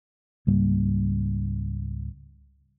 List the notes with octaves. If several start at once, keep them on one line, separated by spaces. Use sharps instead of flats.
C#2 G#2 G3 A#3